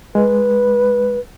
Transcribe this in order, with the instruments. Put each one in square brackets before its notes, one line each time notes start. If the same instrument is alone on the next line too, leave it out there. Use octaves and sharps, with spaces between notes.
[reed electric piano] G#3 [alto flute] B4